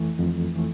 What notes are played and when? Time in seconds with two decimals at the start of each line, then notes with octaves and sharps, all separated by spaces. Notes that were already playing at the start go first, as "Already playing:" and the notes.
Already playing: F2 E3 A3
0.19 F2
0.55 E3 A3